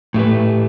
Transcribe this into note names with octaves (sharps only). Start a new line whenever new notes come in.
A2 A3 G4 B4